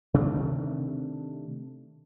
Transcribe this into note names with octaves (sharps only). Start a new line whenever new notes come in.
C3 D#3 A3 D4